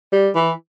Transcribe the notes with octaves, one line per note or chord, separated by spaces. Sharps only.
G3
E3